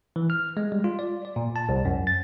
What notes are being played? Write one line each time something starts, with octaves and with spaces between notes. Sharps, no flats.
E3
F6
G#3
G3
F4
D5
D5
A#2
A5
C2
F#2
A6